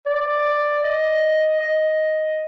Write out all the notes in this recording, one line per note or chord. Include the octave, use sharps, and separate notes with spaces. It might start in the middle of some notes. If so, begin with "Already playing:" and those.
D5
D#5
D#5